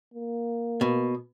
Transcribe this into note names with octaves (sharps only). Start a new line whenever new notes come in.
A#3
B2